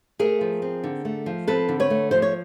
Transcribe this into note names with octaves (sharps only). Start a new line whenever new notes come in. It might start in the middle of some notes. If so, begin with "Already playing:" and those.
A3 G#4 A#4
F3
C4
D3
A3
F3
C4 A4 B4
D3
B4 C#5
A3
F3 C5
C#5